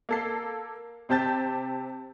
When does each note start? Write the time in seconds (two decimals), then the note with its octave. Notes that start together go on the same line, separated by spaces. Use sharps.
0.09 A#3 A4 C7
1.09 C3 C4 G4 A5 G6 A6